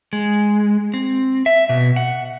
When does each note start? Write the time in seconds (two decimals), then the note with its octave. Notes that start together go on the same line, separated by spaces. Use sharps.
0.13 G#3
0.94 C4
1.46 E5
1.69 B2
1.96 F#5